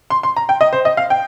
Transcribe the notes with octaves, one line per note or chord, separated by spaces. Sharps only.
C6
C6
A#5
G5
D#5
C5
D#5
F5
G5